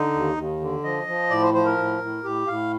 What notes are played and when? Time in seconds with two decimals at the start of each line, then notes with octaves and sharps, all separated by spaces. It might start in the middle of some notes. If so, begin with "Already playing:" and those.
Already playing: D3 D#4
0.13 D#2
0.36 D#2
0.60 D3
0.84 F3 D#5
1.07 F3
1.30 A2 D5
1.42 C5
1.54 F3 C5
1.65 A#4
1.78 A2
2.01 A2
2.24 A2 G4
2.47 A2 F5